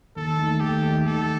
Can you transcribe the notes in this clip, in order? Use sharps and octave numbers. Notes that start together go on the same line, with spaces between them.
D#2 A4
D#3 A3
D#2 G4
D#3 A3
D#3 A4